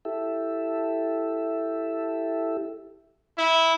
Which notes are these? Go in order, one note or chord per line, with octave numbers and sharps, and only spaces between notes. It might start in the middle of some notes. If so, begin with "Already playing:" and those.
E4 G4 A4 E5
E4